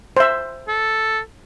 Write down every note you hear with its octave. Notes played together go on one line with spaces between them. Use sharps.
C5 E5
A4